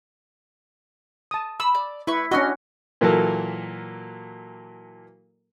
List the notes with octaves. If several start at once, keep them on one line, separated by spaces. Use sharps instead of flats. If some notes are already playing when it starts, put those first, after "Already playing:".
A5 D#6
B5 E6
D5
E4 B4 C#6
C#4 D4 F#4 D#5 E6 F6
A#2 E3 F#3 A#3 A4 A#4